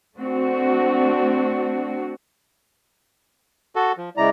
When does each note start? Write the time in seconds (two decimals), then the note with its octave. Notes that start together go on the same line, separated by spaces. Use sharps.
0.18 A3 C4 D4 F#4
3.76 F#4 A4
3.98 F3
4.17 C#3 G#3 E4 D5 A#5